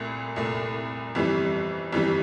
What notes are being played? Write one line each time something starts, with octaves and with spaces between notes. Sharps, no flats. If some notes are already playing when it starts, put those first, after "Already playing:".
Already playing: C2 A#2 A3
C2 A#2 A3
G1 F2 E3 G3
G1 F2 E3 G3